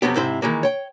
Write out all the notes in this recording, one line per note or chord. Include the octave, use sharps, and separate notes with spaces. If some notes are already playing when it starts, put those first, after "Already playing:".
F2 C3 F#3 B3 G4
G#2 C3 E4 C5
D#3 E3 G#3 A#3
C#5 G5